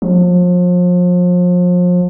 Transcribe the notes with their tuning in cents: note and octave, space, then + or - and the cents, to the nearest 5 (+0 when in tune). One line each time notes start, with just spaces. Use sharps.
F3 +35